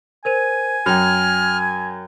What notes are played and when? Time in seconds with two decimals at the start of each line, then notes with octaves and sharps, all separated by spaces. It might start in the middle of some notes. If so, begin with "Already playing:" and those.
0.25 A#4 C5 G#5 D#7
0.86 F#2 F#4 G5 F6